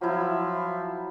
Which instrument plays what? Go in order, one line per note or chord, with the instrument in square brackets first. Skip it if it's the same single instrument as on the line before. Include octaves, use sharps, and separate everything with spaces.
[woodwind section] F3 [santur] F#3 E4